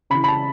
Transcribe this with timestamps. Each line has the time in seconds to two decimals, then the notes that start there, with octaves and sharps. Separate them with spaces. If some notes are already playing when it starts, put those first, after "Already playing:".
0.10 C#3 B5
0.15 E3
0.24 B5
0.28 A5